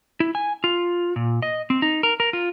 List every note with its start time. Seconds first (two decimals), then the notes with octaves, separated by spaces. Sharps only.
0.20 E4
0.35 G#5
0.64 F4
1.16 A#2
1.42 D#5
1.70 C4
1.82 D#4
2.03 A#4
2.20 A#4
2.33 F4